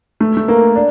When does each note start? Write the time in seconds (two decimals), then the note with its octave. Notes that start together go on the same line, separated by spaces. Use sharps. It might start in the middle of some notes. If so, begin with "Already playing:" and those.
0.20 A3
0.37 A3
0.48 A#3
0.76 D4